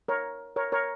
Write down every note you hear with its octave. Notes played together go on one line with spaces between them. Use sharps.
A#4 C#5
A#4 C#5
A#4 C#5